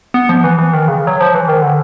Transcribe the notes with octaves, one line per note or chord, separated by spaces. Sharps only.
B3
F3
E3
E3
D#3
C#3
F#3
F3
E3
D#3
D3